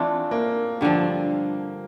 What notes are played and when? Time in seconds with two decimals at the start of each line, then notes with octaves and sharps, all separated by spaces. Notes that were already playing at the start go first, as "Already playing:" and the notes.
Already playing: E3 A3 C4 D4 F4
0.31 A#3
0.81 G2 D3 F3